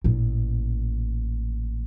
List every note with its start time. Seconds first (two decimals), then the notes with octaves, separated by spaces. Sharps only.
0.04 A1 A#2